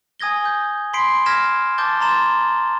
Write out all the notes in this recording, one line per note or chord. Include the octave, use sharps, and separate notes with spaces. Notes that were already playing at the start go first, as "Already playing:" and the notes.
G#5 D#6 G#6 A#6 G7
G6
B5 C6 B6 C7 D7
F6 G#6 A#6 B6 E7
A5 D6 G6 A6 G7
A#5 C6 A6 E7